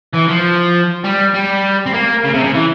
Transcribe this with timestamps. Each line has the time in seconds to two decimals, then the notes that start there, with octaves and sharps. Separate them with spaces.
0.14 E3
0.28 F3
1.04 G3
1.34 G3
1.86 C4
1.94 A#3
2.24 C#3
2.34 C3
2.44 C#3
2.54 E3